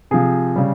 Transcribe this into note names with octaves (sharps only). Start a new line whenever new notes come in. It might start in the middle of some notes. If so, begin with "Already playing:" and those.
C3 F3 G#4
C#3 G3